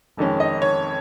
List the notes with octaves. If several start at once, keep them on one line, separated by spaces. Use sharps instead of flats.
F1 F2 D#3 G#3 C#4
D#5
C#5